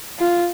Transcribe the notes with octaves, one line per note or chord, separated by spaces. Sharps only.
F4